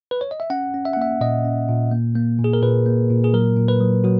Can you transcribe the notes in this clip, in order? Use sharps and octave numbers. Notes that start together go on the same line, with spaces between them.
B4
C#5
D#5
E5
C#4 F#5
C#4
E5
F#5
A#3 E5
A#2 D#5
C#4
A#2
A#3
A#3
A#2
G#4
A#4
A#2 B4
A#3
A#2
G#4
F#3 A#4
A#2
B4
F#3
F#3 F#4